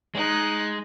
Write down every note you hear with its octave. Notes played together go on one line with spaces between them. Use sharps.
G#3 D#4 F#6